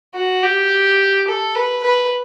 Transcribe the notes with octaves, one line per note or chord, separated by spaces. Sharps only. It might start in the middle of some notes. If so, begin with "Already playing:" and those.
F#4
G4
A4
B4
B4